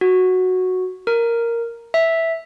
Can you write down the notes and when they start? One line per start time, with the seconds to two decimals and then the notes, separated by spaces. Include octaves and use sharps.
0.01 F#4
1.07 A#4
1.94 E5